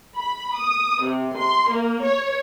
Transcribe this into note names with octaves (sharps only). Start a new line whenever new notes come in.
B5
D#6
C3
C6
A#3
C#5